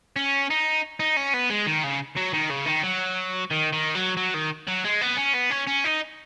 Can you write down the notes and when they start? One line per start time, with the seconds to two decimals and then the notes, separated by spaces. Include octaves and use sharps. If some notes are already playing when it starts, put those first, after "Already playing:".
0.16 C#4
0.50 D#4
1.00 D#4
1.17 C#4
1.34 B3
1.50 G#3
1.67 D#3
1.84 C#3
2.17 F#3
2.34 D#3
2.51 C#3
2.66 D#3
2.84 F#3
3.51 D#3
3.73 D#3
3.95 F#3
4.17 F#3
4.34 D#3
4.67 F#3
4.84 G#3
5.01 B3
5.17 C#4
5.35 B3
5.51 C#4
5.67 C#4
5.85 D#4